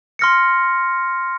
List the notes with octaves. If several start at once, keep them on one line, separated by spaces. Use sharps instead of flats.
C6 F6 A#6 C#7